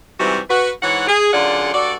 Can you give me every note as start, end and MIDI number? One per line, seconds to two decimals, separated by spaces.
0.19 0.38 44
0.19 0.38 48
0.19 0.38 52
0.19 0.38 55
0.19 0.38 60
0.19 0.38 66
0.49 0.70 66
0.49 0.70 71
0.82 1.07 44
0.82 1.07 52
0.82 1.07 73
0.82 1.07 78
1.07 1.30 68
1.33 1.70 42
1.33 1.70 50
1.33 1.70 65
1.33 1.70 68
1.33 1.70 74
1.33 1.70 78
1.74 1.94 43
1.74 1.94 66
1.74 1.94 69
1.74 1.94 74